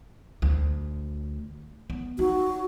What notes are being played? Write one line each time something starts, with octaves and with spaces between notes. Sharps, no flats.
D2
B3
D#4 F#4